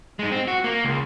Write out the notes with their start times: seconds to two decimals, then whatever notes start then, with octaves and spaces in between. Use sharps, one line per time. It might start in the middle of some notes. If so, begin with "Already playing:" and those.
0.19 G#3 D#4
0.31 C4
0.48 F#4
0.64 A#3
0.84 C#2